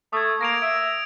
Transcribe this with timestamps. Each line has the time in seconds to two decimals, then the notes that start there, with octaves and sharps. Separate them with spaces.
0.13 A3 D#6 G#6
0.41 A#3 A#6 D7 F7
0.62 E5 D7